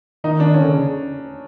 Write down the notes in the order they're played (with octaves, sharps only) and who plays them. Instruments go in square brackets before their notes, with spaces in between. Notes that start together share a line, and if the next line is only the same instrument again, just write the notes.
[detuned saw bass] D#3 [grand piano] D#4
[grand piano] D4
C#4
[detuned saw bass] D3
C#3